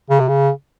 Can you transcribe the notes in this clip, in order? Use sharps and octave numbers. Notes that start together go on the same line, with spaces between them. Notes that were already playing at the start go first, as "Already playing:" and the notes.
C#3
C3
C#3